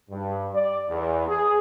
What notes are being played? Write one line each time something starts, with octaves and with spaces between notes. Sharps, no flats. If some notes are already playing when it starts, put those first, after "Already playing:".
G2
D5
E2
G#4